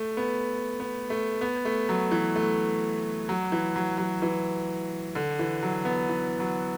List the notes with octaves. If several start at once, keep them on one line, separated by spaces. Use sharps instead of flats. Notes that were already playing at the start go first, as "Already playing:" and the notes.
Already playing: A3
B3
B3
A3
B3
A3
F#3
E3
A3
F#3
E3
F#3
F#3
E3
D3
E3
F#3
B3
E3
F#3